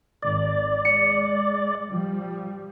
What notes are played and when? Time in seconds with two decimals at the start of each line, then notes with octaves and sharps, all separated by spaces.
0.22 G#1 D5
0.85 G#3 C#7
1.94 F3 G3